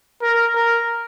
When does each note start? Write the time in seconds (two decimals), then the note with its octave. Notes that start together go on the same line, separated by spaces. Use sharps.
0.22 A#4
0.56 A#4